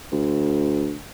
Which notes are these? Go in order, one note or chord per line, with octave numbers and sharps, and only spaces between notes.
D2